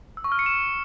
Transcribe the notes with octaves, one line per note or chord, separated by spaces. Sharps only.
E6
C#6
F6
C#7
E7